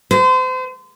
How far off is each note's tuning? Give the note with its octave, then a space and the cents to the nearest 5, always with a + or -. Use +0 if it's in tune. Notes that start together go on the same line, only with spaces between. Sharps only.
C5 -35